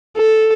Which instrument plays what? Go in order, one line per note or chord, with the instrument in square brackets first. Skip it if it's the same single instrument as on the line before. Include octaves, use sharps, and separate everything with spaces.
[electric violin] A4